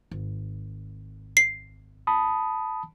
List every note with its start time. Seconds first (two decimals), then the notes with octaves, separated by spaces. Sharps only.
0.11 G#1
1.37 C7
2.07 A5 B5 D#6